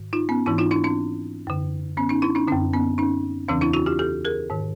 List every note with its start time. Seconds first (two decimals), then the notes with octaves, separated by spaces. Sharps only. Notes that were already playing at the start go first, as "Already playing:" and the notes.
Already playing: G#2 D#3
0.13 D#4 F4
0.29 B3 C#4
0.46 G#2 E3 D4 E4
0.58 D#4 F4
0.71 D4 E4
0.84 C4 D4
1.47 F#2 D3
1.97 B3 C#4
2.10 C#4 D#4
2.22 D4 E4
2.35 C#4 D#4
2.47 F#2 D3 C4 D4
2.73 B3 C#4
2.98 C#4 D#4
3.48 E2 C#3 E3 C4 D4
3.61 D4 E4
3.73 E4 F#4
3.86 F4 G4
3.99 G4 A4
4.25 G#4 A#4
4.50 G#2 D#3